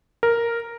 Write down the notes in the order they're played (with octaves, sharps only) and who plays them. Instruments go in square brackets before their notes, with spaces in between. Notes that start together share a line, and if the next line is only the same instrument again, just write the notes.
[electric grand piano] A#4